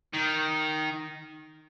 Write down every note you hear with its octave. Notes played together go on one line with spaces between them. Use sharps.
D#3